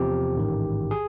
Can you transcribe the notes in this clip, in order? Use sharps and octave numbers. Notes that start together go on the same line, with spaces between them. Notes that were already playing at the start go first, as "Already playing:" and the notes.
Already playing: E2 C3 F3 G4
A1 G#2 D#3
G#4